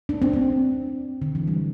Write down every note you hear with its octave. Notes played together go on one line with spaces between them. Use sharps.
D4
C4
C4
D3
E3
G3